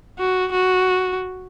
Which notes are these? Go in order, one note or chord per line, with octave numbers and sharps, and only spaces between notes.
F#4
F#4